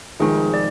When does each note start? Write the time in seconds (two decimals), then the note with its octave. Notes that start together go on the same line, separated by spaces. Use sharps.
0.20 F1 F2 D#3 G#3 G#4
0.54 D5